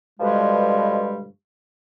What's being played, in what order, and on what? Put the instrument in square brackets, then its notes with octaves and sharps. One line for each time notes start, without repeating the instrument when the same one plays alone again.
[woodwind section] G2 B2 D3 F3 G3 G#3